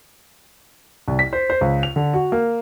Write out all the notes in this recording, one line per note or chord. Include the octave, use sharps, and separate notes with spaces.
C2
B6
C5
C5
C#2
F7
D3
F#4
A#3